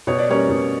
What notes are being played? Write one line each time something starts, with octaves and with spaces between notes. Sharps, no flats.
B2 C#5
D5
G3 A#3 C#4 C#5
B2